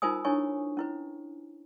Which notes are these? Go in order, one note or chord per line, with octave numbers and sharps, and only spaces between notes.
D#4 F4 A#4 C5 G#5 D#6
D4 E4 A#4 C#5 G#5 C#6
C#4 E4 B4